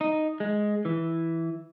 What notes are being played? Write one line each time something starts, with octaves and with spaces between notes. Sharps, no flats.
D#4
G#3
E3